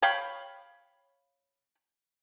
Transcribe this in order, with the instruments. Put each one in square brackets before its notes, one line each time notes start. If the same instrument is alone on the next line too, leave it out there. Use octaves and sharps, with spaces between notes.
[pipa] C#5 F5 G5 B5